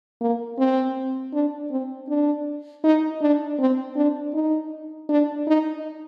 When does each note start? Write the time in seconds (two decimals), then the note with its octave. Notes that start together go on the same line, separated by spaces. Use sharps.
0.21 A#3
0.58 C4
1.33 D4
1.71 C4
2.09 D4
2.84 D#4
3.21 D4
3.59 C4
3.96 D4
4.34 D#4
5.09 D4
5.47 D#4